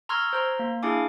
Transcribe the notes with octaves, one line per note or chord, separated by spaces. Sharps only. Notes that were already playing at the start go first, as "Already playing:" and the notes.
A#5 C6 C#6 E6 F6 G#6
C5 A#5 C6
A#3
D4 E4 G#4 F5 G#5 D6